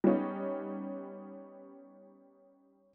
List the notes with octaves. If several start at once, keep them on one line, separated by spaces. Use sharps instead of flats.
G3 B3 C#4 D#4